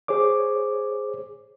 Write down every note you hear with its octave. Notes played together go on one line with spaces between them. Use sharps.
G#4 C5 C#5 D6